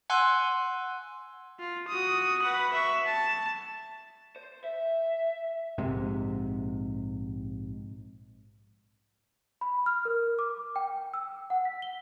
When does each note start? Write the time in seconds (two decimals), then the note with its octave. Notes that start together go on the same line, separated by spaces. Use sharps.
0.10 F#5 G#5 C6 E6 F#6
1.59 F4
1.88 F#4 D#6
2.43 B4 F#5
2.73 E5 C#6
3.06 A5
4.36 C5
4.64 E5
5.78 A#1 G#2 C3
9.61 B5
9.86 F6
10.05 A#4
10.39 D6
10.76 G5
11.14 E6
11.50 F#5
11.65 B6
11.82 G7